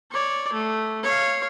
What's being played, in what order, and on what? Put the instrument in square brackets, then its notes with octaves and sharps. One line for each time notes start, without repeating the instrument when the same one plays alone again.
[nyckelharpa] C#5 D5
A3
C#5 F5